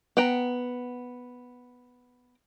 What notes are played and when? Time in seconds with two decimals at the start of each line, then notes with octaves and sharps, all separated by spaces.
0.17 B3 G5 A#5